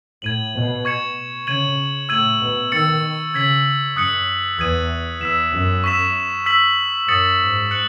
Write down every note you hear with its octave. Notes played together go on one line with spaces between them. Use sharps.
A2 G#6 D#7 F#7
B2
C#6 G#6 C#7 E7
C#3 G#6 D#7 F#7
A2 E6 G#6 D#7 F#7
B2
D#3 E6 A6 C#7
C#3 G#6 B6 F#7
F#2 D#6 F#6 C#7 F#7
E2 D#6 G#6 D#7
E2 E6 B6 E7
F#2
C#6 E6 B6 E7
E6 B6 F#7
F#2 D#6 A6 C#7 F#7
G#2
F#6 C#7 F#7